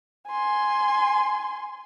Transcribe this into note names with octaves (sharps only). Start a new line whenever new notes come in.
G#5 C6